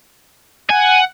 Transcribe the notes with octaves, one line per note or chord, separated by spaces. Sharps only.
F#5 G#5